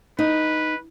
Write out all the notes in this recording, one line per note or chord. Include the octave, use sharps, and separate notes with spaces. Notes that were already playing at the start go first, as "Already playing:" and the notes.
D#4 B4